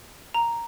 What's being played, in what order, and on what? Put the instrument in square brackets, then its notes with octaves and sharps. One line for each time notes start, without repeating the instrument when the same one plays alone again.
[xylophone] A#5